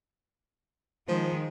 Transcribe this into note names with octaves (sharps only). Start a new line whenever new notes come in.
D#3 F3 G#3